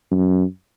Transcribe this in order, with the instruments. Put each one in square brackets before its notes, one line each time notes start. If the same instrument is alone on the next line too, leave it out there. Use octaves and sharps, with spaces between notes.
[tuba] F#2